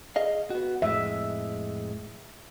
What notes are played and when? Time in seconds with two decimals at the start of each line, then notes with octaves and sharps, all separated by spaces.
0.16 G#4 D#5 F5
0.50 B3 F#4
0.82 F2 A2 G#3 E5